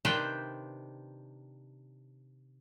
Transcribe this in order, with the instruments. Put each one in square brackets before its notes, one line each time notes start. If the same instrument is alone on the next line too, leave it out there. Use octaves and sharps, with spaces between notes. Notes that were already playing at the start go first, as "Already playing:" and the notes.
[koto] C3 D#3 D4 B4 C5 G5